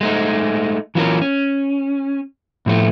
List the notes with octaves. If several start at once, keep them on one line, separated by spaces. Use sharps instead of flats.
G#3 A3 D#4
E3 F#3 C#4 F4 A4 A#4
C#4
A2 F3 A3